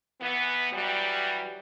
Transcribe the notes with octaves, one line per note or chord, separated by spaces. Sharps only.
E3 B3
E3 F#3 G3